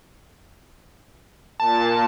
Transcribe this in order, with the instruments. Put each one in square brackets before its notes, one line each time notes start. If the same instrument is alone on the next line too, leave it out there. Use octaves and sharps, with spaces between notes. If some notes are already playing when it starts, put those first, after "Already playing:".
[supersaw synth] A#2 [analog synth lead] A5